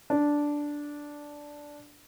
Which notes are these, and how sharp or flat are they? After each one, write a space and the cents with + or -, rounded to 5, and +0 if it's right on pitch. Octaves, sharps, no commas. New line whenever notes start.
D4 -5